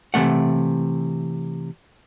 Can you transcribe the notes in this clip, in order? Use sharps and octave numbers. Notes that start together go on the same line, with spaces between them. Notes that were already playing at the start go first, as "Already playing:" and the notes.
C3 E3 A3 F#5